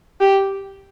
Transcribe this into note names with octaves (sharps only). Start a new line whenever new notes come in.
G4